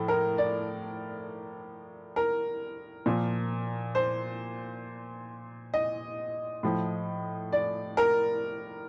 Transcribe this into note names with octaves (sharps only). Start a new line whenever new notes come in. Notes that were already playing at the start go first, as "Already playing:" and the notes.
Already playing: A2 F3 A4
A#4
D5
A#4
A#2 F3
C5
D#5
A2 F3
D5
A#4